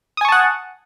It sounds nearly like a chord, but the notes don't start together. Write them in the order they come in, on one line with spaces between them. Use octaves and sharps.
D#6 G#5 C#6 A5 F#5